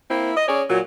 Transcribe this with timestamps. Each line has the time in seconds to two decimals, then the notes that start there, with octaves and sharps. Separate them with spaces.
0.10 A#3 C4 E4
0.37 D#5
0.48 C#4 G#4 C#5 D5
0.70 A#2 F#3